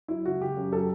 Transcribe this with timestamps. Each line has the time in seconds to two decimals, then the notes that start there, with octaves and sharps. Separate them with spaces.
0.08 F#3 E4
0.26 C#2 F#4
0.40 C#3 G4
0.57 F#2
0.73 F#3 A4